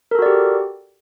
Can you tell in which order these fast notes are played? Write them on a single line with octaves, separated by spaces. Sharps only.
A#4 A4 F#4 D5 G4